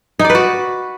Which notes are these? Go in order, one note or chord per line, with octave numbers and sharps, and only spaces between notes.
D#4
D5
B4
F#4